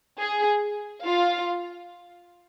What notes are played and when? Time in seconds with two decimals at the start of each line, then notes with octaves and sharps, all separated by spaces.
0.18 G#4
1.03 F4 F5